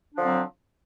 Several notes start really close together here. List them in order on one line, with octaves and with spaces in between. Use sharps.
D4 F3 D3 C4 F#3